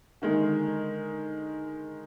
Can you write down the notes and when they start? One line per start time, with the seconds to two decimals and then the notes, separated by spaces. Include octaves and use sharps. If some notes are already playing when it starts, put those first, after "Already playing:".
0.22 D3 D#3 G#3